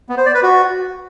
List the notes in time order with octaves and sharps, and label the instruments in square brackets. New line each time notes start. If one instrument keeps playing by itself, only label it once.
[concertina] B3
C5
D5
B4
F#4